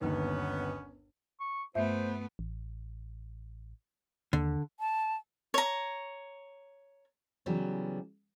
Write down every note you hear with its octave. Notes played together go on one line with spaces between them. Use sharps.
G1 D#2 B3 C#4
C#6
G2 A3 B3 C5 E5
A1
D#2 D3
A5
C#5 A#5
C#3 E3 F#3 G3 B3